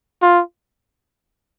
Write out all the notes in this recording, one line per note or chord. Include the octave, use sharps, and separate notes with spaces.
F4